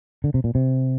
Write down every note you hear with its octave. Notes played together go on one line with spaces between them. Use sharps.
D3
C3
A#2
C3